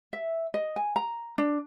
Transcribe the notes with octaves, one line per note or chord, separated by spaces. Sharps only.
E5
D#5
G#5
A#5
D4